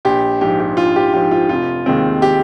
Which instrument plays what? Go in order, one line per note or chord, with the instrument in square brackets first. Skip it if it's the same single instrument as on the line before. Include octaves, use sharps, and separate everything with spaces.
[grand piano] A#1 G4
G#2 F3 G4
G4
A#1 F4
G4
G#2 F3 G4
F4
F1 F4
D#2 D#3 G#3 C4
G4